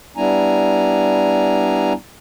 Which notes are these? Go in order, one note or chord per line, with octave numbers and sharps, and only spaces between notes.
G3 B3 D4 E4 G#5 A#5